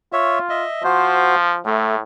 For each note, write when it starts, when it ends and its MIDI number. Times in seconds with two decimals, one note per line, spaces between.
0.13 0.64 65
0.13 0.39 73
0.13 0.39 76
0.49 0.83 75
0.49 0.83 76
0.84 1.58 53
0.84 1.36 66
0.84 1.36 72
1.66 2.01 45
1.66 1.96 57